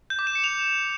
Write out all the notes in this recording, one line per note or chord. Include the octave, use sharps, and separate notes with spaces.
G6
D6
E7
C#7
F7